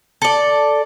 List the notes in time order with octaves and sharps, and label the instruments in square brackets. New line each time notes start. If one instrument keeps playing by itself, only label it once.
[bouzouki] A4 D5